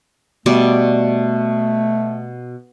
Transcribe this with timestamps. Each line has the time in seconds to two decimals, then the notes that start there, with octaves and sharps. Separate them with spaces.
0.46 B2 G3 A3 D5